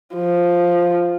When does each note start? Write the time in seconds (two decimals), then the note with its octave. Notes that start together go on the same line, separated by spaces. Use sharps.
0.15 F3